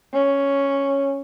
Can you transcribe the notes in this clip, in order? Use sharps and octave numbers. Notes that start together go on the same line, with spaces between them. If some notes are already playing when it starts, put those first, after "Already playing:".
C#4